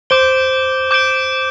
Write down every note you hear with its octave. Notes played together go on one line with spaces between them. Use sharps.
C5 D6 G6 D7 G7
D6 G6 D7 G7